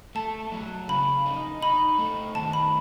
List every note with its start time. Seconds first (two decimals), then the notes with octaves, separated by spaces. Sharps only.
0.15 A3 A5
0.52 F#3
0.88 C#3 B5
1.26 D#4
1.61 D#4 B5
1.98 A3
2.35 D#3 A5
2.53 B5